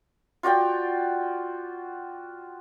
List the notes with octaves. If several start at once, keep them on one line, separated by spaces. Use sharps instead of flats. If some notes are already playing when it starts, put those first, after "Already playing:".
F4 F#4 D5 G5